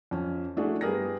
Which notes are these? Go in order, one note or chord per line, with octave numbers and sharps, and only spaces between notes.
F2 C#4
A3 D4 E4 F#4 G#4
G2 B3 G4 G#4 A#4 A#6